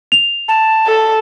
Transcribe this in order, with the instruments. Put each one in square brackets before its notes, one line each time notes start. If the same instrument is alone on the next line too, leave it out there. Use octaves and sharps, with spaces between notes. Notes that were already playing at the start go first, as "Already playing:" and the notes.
[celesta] F7
[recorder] A5
[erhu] A4